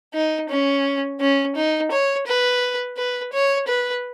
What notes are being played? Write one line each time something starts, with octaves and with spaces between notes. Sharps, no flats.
D#4
C#4
C#4
D#4
C#5
B4
B4
C#5
B4